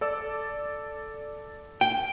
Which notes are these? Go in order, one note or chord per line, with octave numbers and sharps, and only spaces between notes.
A4 D5 E6
G5